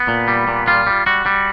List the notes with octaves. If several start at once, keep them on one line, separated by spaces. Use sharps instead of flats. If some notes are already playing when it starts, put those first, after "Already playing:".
Already playing: B3
A#2
G3
A#2
G3 F4
G3
G3 F#4
G3